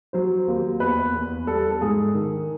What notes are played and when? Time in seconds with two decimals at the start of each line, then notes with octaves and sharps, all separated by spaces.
0.13 F#3 C5
0.47 D#2
0.80 E2 B4
1.14 E2
1.47 G3 A4
1.71 A4
1.81 G#2 G#4
2.15 D#3